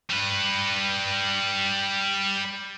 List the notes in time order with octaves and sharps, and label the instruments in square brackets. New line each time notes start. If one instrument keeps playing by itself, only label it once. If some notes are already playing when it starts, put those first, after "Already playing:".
[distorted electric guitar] G3 B4